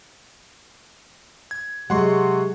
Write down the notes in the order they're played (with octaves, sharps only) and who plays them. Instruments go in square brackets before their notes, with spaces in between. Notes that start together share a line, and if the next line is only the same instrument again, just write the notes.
[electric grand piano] G#6
[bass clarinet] C3 [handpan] F#3 G#3 [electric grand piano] F#5 C6 C#6